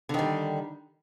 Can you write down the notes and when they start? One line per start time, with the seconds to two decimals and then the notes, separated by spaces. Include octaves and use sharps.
0.09 D3
0.14 D#3
0.19 G3